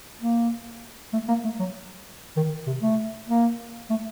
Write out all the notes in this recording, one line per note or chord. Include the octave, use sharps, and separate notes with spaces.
A#3
A3
A#3
A3
F#3
D#3
C3
A3
A#3
A3